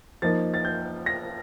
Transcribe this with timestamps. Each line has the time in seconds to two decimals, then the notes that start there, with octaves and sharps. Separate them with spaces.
0.22 F3 A#3 D#4 A6
0.54 A6
0.65 G6
1.06 A#6